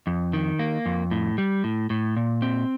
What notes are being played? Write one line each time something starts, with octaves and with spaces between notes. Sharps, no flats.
F2
D#3
A#3
F2
A2
G3
A2
A2
A#2
C4